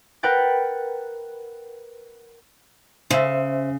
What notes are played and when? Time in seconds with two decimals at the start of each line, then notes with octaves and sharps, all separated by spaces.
0.23 A#4 B4 F#5 G5 A6
3.10 C#3 C5 E5